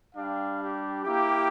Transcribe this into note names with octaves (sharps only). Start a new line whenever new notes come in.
G3 D4 G4 F5
G4
A#3 E4 G4